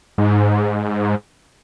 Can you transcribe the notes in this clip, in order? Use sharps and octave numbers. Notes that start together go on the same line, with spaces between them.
G#2